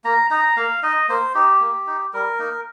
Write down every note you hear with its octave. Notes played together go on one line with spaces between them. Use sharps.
A#3 A#5
D#4 A#5
A#3 F5
D#4 D#5
A#3 C5
D#4 G4
A#3
D#4
G3 A#4
A#3 D#4